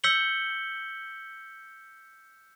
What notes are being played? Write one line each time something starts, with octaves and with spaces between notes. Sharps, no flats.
E6 G6 B6 C#7 F#7 G7